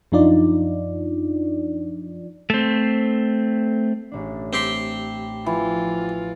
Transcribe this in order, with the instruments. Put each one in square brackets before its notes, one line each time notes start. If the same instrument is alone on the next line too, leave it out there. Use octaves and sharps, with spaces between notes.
[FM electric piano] F#2 F3 D4 D#4 F4 D5
[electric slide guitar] A3 C4
[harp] A1 D4
[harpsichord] C4 G4 C6
[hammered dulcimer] E3 [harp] F3 [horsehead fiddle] F4